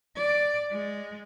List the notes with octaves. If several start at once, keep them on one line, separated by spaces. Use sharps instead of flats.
D5
G#3